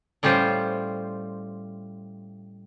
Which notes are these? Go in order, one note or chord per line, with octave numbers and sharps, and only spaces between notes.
A2 G3 C#4 F4 C5